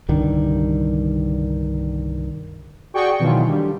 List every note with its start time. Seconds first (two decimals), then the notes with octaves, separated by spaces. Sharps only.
0.09 C2 G2 D3 D#3
2.94 F#4 G#4 D5 G5 C#6
3.19 B2 D#3 E3 F#3 F4
3.47 D3 G3